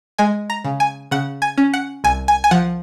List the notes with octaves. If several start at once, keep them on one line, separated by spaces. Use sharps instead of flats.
G#3 G#5
A#5
C#3
G#5
C#3 F#5
G#5
C#4
F#5
C2 G#5
G#5
G#5
F3 F#5